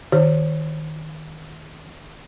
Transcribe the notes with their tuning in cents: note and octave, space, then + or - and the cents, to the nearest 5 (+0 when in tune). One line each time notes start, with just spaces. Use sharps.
D#3 +0 G4 +0 C5 +0